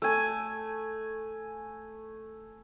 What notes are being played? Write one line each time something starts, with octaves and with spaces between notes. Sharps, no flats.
A3 G#5